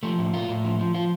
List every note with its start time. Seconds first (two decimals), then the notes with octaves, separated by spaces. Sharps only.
0.03 F3 A3
0.18 A2
0.33 A2 F4
0.48 A2
0.65 F3
0.79 F3
0.94 F3 F4